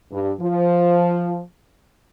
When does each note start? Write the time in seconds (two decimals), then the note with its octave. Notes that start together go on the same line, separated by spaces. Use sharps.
0.11 G2
0.40 F3